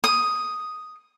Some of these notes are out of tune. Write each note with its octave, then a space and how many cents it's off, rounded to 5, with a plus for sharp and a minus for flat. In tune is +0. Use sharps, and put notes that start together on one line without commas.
D#6 +0